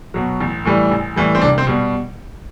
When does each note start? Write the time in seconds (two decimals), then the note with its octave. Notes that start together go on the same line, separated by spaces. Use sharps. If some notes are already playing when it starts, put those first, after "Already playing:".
0.14 B2 F#3
0.41 A1
0.65 A2 E3 G3
0.91 A1
1.16 A2 E3 G3
1.35 C4
1.41 C2 D4
1.58 C4
1.67 B2 G3